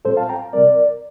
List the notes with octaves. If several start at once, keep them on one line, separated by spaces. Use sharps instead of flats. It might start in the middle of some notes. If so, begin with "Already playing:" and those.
A2 G3 C4 F4 A4 C5
F5 A5
G5 A#5
C3 G3 C4 A#4 D5